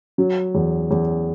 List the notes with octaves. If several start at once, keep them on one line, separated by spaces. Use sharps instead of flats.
F#3
E2
E2